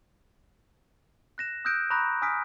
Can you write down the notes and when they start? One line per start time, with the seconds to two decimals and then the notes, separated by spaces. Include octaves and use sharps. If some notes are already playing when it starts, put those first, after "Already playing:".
1.38 F#6 A#6 E7
1.65 D#6 E6 F#6 G6 A#6 D7
1.90 A#5 B5 C#6 D#6 F#6 A#6
2.22 G#5 D#6 F6 B6 D7